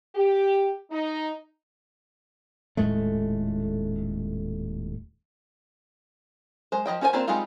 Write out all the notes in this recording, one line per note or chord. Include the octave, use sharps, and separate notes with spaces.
G4
D#4
D#1 A2 G#3 A3
G#3 C5
F3 F#3 D#5 G5
C#4 F#4 C5 D5 G#5
A#3 C4 D4 F4 C5
G3 G#3 C4 D#4 F4